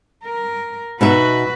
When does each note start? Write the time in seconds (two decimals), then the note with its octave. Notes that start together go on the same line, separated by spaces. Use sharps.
0.24 A#4
1.01 B2 D#4 F#4 B4 E5